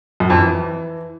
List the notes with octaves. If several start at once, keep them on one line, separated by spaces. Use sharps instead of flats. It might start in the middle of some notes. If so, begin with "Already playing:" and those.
F#2
F2
E3